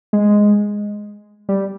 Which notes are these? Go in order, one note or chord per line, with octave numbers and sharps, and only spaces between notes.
G#3
G3